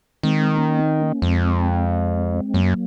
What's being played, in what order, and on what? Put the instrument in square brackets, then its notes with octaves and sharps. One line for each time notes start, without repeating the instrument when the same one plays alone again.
[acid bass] D#3 [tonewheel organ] G#3 C4
[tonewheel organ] A#3 C#4
C4 D#4
A#3 C#4
[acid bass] F2 [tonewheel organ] G#3 C4
[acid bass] F#2 [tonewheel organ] F#3 A#3